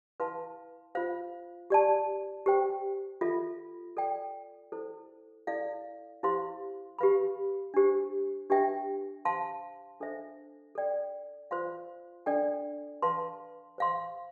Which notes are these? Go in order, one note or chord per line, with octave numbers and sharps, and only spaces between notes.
E4 B4 F5 A5 C6
F4 C5 F5
G4 D5 A5
G4 C5 G5
F4 A4 E5 B5
A4 D5 G5
E4 A4 C5
E4 A4 D5 F5
E4 G4 C5 F5 C6
G4 B4 F5 B5
D4 G4 C5
D4 G4 B4 E5 G5
C5 F5 A5 C6
D4 A4 C5 E5
A4 D5 G5
F4 C5 F5 C6
D4 A4 D5 G5
B4 F5 A5 C6
C5 F5 C6